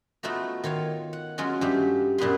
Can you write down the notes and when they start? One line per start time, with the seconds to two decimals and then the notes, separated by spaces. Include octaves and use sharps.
0.23 A3 B3 D#4 F4 F#4
0.64 D#3 F4 C#5 F5
1.13 F#5
1.38 F#3 G#3 C#4 F4 F#4
1.61 G2 A3 G4
2.18 F#2 A#2 B3 B4 C6